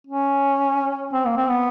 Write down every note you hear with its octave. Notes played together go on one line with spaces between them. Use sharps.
C#4
C4
A#3
C4
B3